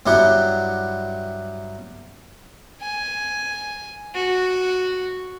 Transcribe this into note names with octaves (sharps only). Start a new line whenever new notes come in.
G2 F#3 E4 G4 F#5
G#5
F#4